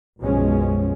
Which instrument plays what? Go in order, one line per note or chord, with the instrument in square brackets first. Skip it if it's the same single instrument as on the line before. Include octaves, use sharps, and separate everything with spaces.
[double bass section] B1 F#2 B2 F3 G#3 C#4